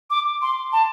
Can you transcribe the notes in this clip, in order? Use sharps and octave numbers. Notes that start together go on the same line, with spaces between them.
D6
C6
A5